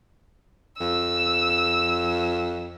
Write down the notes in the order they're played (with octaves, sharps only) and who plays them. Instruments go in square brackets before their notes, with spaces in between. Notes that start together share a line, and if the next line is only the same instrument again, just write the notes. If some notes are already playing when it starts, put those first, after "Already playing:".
[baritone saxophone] F2 [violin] E6